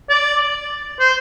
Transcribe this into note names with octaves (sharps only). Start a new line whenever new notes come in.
D5
C5